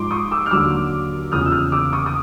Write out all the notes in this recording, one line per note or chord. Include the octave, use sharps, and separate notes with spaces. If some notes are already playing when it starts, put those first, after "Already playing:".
Already playing: G#2 F3 C6 D6
C#6 D#6
D6 E6
F6
D#2 D3 F#3 D6 E6
E2 C#3 F3 D#6 F6
E6
D#6 F6
D6 E6
C#6 D#6
D#6